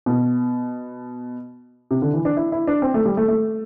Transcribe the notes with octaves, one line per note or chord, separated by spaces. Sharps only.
B2
C3
D3
E3
D4
E4
E4
D4
C4
A3
G3
A3
A3